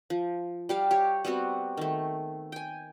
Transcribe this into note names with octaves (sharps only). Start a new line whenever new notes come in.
F3
G3 G4 F5
G4 C#5
G3 B3 C4 F#4
D#3 A3
G5 G#5